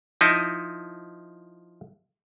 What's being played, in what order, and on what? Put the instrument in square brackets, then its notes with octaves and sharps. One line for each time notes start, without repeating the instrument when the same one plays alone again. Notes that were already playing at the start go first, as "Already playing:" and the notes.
[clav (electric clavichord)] F3 D#4 E4 D#5